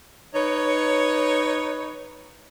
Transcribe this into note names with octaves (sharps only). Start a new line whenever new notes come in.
D#4 B4 C#5